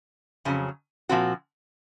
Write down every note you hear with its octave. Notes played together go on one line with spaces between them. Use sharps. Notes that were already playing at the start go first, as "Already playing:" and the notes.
F2 C#3 F#3
A#2 F3 C4 F#4